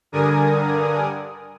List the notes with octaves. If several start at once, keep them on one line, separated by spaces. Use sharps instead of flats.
G2 D3 A#4 D5 G#5 D#6